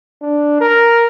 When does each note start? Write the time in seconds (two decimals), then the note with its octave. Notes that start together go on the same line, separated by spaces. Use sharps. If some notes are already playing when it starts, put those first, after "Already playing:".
0.22 D4
0.61 A#4